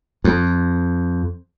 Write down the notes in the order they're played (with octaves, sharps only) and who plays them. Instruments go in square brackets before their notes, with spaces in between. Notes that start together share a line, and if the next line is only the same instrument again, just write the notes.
[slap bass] F2